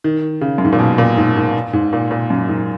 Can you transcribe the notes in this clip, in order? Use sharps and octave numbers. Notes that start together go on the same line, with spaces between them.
D#3
C#3
F#2
G#2
A#2
B2
A#2
G#2
G#2
G#2
A#2
A#2
F#2
G#2